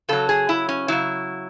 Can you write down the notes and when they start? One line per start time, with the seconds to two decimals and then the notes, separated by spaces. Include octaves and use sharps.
0.09 C#3 F#3 A4
0.29 G#4
0.49 E4
0.69 C#4
0.88 C#3 F#3 E4